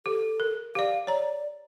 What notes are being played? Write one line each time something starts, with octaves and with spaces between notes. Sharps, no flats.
G4 A4
A#4
G4 D5 F5
C#5 D5 A#5